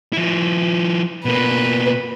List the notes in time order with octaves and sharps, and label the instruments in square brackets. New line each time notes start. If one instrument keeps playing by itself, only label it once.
[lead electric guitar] F3 E4
[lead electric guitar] B2 A#3 [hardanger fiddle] B4